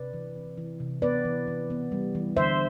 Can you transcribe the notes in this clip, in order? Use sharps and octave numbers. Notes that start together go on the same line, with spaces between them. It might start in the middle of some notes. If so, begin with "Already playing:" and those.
Already playing: C3 B4 D5
E3
C4
E3
C3
B3 B4 D5
E3
E3
B3
G3
E3
D3 C5 E5